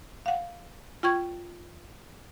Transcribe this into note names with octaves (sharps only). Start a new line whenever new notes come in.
F5 F#5
F4 G5 C#6 G#6